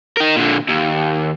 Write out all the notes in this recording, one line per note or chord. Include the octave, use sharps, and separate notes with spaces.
D#4 A#4
A#2 D3
D#2